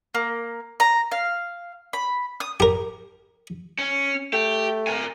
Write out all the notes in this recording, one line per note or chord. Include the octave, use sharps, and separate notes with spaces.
A#3
A#5
F5
B5
D#6
G4 A#4
C#4
A3 G4
A#4 G#5